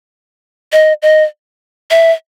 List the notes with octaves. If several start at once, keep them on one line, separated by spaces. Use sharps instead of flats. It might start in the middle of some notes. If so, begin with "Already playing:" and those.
D#5
D#5
E5